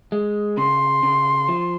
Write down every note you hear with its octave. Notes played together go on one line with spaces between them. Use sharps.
G#3
C#3 C6
C#3
F3